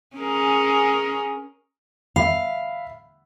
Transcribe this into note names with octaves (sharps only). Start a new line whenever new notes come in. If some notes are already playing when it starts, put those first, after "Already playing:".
C#4 G#4 A#4
E5 F5 B5